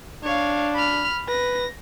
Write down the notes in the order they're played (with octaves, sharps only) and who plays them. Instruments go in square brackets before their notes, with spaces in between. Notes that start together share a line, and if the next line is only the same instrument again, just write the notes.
[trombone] D4 [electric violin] C#5 F5
[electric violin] B5 F6
[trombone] B4 [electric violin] A#6